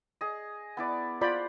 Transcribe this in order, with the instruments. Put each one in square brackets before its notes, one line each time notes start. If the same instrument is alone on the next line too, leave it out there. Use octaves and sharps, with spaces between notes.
[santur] G#4 D#5
B3 E4 D5
[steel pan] F4 D5 B5 [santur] C5 F#5